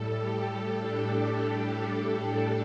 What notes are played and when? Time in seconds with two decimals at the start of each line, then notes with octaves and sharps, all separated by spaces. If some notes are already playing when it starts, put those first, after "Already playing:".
Already playing: A2 G3 A4
0.20 G4
0.79 D4